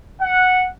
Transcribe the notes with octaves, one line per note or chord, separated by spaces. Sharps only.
F#5